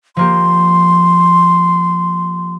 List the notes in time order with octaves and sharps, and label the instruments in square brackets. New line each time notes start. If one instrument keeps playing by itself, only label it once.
[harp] F3 A#3 G4 [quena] C6